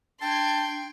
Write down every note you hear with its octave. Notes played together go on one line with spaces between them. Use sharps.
D4 G5 A5 C6 G#6